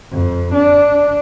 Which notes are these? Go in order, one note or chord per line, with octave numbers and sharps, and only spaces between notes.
F2
D4